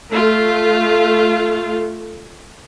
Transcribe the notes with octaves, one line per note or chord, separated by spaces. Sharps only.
A3 F4